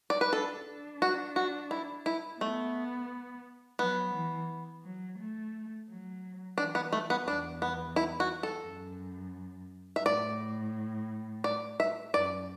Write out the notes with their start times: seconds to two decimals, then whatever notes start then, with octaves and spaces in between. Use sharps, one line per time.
0.10 D5
0.21 B4
0.32 D4 A4
0.67 D4
1.02 F#4
1.36 F#4
1.71 E4
2.06 E4
2.40 A3 B3
3.79 F#3 B3
4.14 E3
4.84 F#3
5.19 A3
5.89 F#3
6.58 E3 D4
6.75 B3
6.93 A3
7.10 B3
7.27 E2 D4
7.62 B3
7.96 E4
8.20 F#4
8.43 A4
8.66 F#2
9.96 E5
10.06 A2 D5
11.44 D5
11.80 E5
12.14 F#2 D5